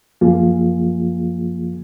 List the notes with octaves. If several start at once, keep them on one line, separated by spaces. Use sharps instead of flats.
F#2 F3 A#3 F4 G#4